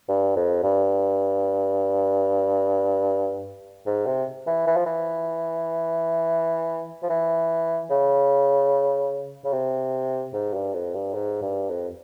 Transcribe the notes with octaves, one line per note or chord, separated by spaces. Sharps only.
G2
F2
G2
G#2
C3
E3
E3
F3
E3
F3
E3
C#3
C#3
C3
G#2
G2
F2
G2
G#2
G2
F2